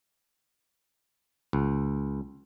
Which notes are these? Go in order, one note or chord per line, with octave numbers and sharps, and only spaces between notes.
C#2